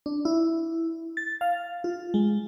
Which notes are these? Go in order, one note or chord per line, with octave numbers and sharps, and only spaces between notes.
D4
E4
A6
F5
F4
G#3